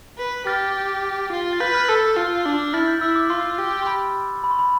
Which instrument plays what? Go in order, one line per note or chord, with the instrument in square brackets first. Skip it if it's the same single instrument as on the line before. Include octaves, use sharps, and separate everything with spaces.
[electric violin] B4
[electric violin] G4 [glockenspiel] F6 A6
[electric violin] F4
[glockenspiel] A6
[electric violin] B4 [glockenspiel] G6
[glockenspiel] F6
[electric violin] A4 [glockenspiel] E6
[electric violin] F4 [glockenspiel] F6
[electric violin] D4
[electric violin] E4 [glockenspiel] F6 A6
[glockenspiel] G6
[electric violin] E4 [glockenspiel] E6
[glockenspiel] D6
[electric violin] F4 [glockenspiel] C6
[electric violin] G4
[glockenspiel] C6
B5
B5
C6
B5